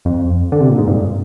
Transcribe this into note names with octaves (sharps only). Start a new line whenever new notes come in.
F2
D3
C3
A#2
G#2
G2